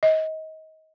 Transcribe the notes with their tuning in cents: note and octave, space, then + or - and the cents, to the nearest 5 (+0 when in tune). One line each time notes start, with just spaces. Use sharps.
D#5 +25